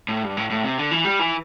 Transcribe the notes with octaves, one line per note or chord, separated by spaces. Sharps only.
A2
G2
A2
A2
C3
D3
E3
G3
E3